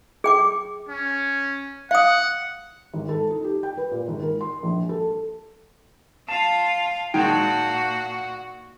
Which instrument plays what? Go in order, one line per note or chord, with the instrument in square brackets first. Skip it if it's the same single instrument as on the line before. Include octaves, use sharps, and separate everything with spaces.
[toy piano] G#4 G5 D6
[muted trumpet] C#4
[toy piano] F5 D#6 [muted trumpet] F#5
[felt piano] G#1
A4
D#4
G4
G5
B4
A#2
G#1
A#4
C6
A#1
A4
[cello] F4 F5 [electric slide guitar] A5
[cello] A#2 F#4 [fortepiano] D#3 G#3 [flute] F#5 [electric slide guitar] G5 A5